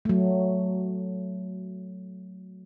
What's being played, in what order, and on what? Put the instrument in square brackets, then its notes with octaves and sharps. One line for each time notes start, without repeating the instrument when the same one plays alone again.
[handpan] F#3 A3